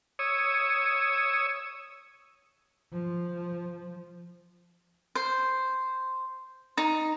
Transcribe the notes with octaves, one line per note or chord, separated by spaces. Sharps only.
C#5 D#6 E6
F3
C5
D#4